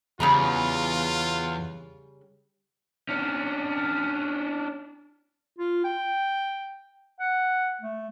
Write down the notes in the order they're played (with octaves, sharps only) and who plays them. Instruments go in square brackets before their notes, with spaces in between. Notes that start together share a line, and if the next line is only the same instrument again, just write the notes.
[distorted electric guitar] E2 [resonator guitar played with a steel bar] C#3 G3 A#5 [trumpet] F4
[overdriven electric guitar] C#4 D4
[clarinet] F4
G5
F#5
A3